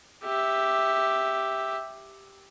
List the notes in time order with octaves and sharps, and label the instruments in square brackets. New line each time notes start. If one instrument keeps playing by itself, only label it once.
[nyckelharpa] G4 E5